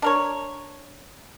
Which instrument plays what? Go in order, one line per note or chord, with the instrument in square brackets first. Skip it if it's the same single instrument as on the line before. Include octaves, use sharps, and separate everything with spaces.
[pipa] D4 A#4 C#5